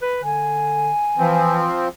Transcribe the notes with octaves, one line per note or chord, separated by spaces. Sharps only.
B4
D3 G#5
E3 F3 C4